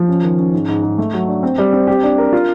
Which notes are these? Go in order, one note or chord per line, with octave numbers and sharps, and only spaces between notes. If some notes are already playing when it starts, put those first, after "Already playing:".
Already playing: F3
C#4
D#3
C#4
G#2
G#2
G#2
A3
F#3
D4
C4
G3
C4
G4
D4
A#4
F4